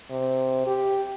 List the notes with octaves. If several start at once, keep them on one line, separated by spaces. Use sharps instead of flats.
C3
G4